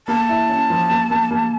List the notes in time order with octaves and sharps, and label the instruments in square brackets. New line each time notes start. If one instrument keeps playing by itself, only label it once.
[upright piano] A#3 [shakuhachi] A5
[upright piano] E4
C#4
F3
A#3
A#3
A#3